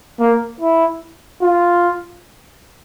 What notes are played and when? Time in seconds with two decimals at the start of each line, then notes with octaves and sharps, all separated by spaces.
0.20 A#3
0.61 E4
1.42 F4